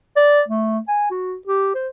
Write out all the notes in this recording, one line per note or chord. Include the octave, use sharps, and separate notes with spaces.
D5
A3
G#5
F#4
G4
C5